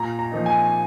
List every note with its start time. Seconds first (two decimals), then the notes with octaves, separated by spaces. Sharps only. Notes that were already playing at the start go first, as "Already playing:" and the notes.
Already playing: A#2 A#5
0.19 A#5
0.32 F3 A#3 D#4
0.46 G#5